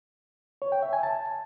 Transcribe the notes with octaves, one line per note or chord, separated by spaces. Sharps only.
C#5
G5
E5
G#5
A5